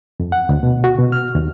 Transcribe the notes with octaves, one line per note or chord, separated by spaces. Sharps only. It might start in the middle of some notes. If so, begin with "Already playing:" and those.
F2
F#5
D2
B2
F#4
B2
F6
D#2